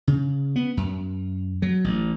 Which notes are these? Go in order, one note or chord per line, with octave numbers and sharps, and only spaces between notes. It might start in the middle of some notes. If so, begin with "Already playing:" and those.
C#3
B3
F#2
F#3
A1